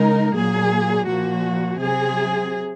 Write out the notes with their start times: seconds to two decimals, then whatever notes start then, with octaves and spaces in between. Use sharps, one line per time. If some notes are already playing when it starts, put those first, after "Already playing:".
Already playing: C#3 G#3 D#4 A#4
0.35 A#2 F#3 A#3 G#4
1.07 A#2 F3 A#3 F#4
1.78 C3 F#3 C4 G#4